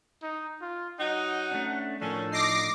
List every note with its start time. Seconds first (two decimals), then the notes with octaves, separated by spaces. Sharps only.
0.23 D#4
0.61 F4
1.00 F#3 D#4 F#5
1.51 A3 C#4 D4
2.01 A2 D#3 F3 C#4 D4 A4
2.32 D#4 D6 A#6 C7